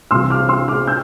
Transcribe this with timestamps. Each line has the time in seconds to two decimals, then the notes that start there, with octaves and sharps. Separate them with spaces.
0.11 C2 C3 E3 C6 E6
0.30 D6 F6
0.49 C6 E6
0.68 D6 F6
0.87 E6 G6